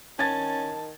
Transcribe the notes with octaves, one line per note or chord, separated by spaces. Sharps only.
D#3 C#4 A5 G#6 A6